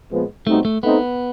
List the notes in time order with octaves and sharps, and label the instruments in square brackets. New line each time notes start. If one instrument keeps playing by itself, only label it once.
[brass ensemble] A#2 F3 G#3 B3
[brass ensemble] B2 G3 C4 D#4 F#4 [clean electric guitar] A3
[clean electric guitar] A3
[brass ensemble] A3 C4 D#4 [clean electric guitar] B3